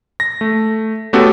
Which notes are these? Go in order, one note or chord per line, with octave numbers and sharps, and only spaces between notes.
A#6
A3
A3 B3 C#4 F#4 G4 A4